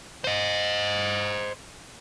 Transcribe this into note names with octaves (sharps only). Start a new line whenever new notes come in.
C5 D#5